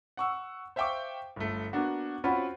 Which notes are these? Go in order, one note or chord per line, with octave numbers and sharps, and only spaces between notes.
F#5 C#6 E6
C5 E5 F5 G5 C#6 D6
G1 A3
A#3 B3 D4 F#4
C4 C#4 F4 F#4 F#5 B5